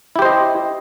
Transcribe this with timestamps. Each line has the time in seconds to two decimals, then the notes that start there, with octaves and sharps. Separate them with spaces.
0.16 E4
0.19 G4
0.22 C5
0.25 D#5